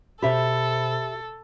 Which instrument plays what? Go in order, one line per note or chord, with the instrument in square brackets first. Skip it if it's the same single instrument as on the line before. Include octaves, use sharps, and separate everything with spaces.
[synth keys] B2 C5 B5 [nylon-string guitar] G4 E5 [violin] A4